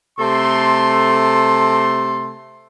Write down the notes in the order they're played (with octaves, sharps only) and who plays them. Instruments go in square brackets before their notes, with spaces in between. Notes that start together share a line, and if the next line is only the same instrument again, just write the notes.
[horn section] C3 A3 A4 C6